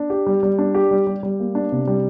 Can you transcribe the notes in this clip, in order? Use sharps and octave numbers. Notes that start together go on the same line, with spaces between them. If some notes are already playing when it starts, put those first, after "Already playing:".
Already playing: D4
G4
G3
G3
D4
G4
G3
G3
G3
A#3
D4
C3
G3